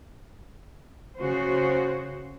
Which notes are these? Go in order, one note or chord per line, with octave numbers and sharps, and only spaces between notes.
C#3 F#4 C5